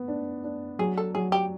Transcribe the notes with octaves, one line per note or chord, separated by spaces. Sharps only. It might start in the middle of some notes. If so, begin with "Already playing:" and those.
Already playing: B3
D4
D4
F#3 G#4
A4
F#3 G#4
G4